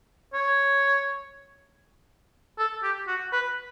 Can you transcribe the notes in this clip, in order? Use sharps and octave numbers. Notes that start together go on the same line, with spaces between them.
C#5
A4
G4
F#4
B4